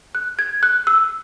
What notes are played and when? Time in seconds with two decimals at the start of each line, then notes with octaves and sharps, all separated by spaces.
0.15 F#6
0.39 G#6
0.63 F#6
0.87 E6